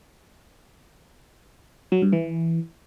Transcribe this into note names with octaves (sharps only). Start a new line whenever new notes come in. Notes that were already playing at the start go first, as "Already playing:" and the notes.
F#3
G2
E3